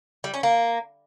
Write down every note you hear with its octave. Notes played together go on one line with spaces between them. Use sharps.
G3
C#4
A#3